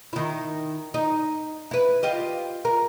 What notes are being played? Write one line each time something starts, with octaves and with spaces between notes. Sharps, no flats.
D#3 E4
D#4
E4 B4
F4 G4 D#5
A#4